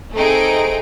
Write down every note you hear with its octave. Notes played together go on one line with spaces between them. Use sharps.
A3 C4 D#4 G#4 D7